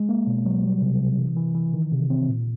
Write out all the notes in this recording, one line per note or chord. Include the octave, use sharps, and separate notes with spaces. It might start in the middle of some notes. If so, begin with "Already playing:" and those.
Already playing: G#3
A#3
B2
F#3
G3
C3
C3
E3
E3
E3
D#3
C3
C4
A#2